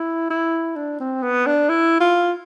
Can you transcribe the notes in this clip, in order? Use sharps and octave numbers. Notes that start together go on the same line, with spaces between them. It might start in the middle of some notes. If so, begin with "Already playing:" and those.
Already playing: E4
E4
D4
C4
B3
D4
E4
F4